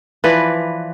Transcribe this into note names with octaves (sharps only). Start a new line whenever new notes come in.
E3 F3 B4 D5